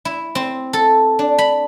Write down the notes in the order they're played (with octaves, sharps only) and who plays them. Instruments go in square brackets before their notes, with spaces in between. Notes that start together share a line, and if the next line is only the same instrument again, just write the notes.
[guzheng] E4
C4
A4
D4
B5